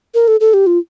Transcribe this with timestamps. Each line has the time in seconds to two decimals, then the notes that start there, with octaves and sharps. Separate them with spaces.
0.14 A#4
0.28 A4
0.40 A4
0.54 G4
0.67 F4